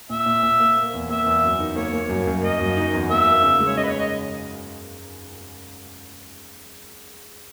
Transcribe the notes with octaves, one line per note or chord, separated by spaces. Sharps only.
A#2 E5
A#2
A#2
A#3
A#3
E2
A#3 E5
E2
F#2
D#4
A#3 C#5
A#3
F#2
F#2
A#3 D#5
F#2
D#4
E2
A#3 E5
A#3
C#3
G#3
C#5
C#3 D#5
B4
C#5
D#5